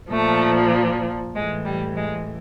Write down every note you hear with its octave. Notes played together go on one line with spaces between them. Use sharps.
A#2 F3 A3
A2 E3 G#3
G3
G#3